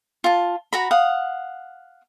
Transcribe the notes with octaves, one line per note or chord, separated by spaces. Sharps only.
F4 A5
F#4 A#5 B5
F5 F#5 D#6